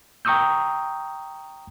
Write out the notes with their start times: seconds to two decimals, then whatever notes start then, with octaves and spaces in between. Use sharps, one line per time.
0.25 G5 A#5 C#6 D#6 E6 G6